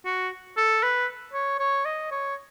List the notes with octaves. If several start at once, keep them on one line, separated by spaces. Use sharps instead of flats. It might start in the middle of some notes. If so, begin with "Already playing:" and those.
F#4
A4
B4
C#5
C#5
D#5
C#5